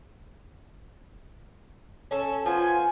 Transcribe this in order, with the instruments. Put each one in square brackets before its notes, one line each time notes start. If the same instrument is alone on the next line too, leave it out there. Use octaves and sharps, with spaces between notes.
[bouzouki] C#4 A4
[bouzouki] F3 B3 [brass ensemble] F4 G#5